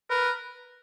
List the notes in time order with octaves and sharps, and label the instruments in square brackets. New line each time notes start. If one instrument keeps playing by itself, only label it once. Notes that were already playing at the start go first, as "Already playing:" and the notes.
[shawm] A#4 [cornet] B4